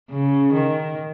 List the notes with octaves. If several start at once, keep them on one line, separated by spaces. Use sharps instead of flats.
C#3
D#3